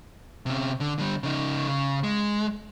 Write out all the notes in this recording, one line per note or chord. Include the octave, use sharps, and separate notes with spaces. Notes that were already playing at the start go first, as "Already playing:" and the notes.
C3 C#4
D3
D3 G3
C#3 D#4
C#3
G#3